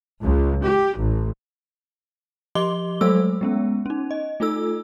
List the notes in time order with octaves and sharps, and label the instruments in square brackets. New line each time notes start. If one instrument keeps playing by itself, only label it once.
[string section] C#2
G4
A1
[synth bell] F3 G4 D#5 C6 D6 G7
F#3 G#3 A3 A4 C5 E6
G#3 B3 C#4
C#4 D#4
D#5
A3 D#4 F4 A4 E6